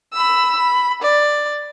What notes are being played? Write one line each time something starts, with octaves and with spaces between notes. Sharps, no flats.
B5 E6
B5
D5